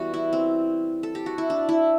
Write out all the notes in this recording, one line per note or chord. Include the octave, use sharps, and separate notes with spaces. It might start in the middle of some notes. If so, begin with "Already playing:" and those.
Already playing: E3 G3 B3 F#4
E4
C4
A4
G4
F#4
E4
D4
E4